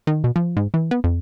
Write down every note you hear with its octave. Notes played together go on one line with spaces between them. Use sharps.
D#3
B2
F3
G#2
E3
B3
F2